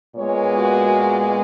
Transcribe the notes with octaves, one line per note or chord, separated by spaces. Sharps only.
A#2 G#3 B3 C#5
F#4